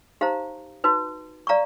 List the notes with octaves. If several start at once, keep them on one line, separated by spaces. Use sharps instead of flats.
D#4 G4 C5 F5 A#5
D#4 F#4 B4
D5 F5 A#5 C#6